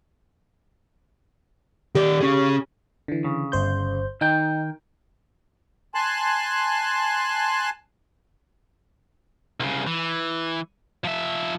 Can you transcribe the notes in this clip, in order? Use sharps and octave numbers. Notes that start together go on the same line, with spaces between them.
D#3 G4 D5
C#4 G#4
D3 E3
C#3
G1 C5 G6
D#3 D#4 G5
G#5 A5 C6 F#6
C2 C#3
E3
F3 E5